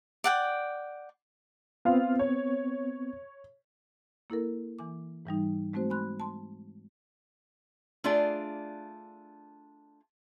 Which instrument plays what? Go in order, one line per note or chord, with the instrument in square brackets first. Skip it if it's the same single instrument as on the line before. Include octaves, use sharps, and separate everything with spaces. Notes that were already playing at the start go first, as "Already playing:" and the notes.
[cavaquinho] D5 F#5 G5
[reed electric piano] B3 C4 [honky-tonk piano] F4 F5
[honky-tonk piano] C#5
[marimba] A#3 E4 A4 A#4
E3 G#5 D6
G#2 E3 G3 D#4
G#3 A3 C4 F#4 C5
G#5 B5 C6 F#6
A5 C6
[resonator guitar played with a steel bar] A3 D4 F4 G#4 D5